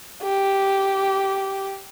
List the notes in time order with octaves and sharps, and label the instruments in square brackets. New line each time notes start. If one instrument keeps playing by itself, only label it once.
[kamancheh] G4